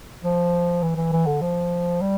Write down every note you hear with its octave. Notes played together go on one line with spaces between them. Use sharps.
F3
E3
E3
E3
D3
F3
G3